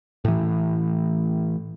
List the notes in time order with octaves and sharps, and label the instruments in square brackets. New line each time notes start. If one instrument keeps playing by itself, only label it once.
[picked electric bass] A2 E3